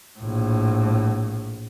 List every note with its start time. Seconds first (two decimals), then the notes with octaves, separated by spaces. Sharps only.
0.19 A#1 A2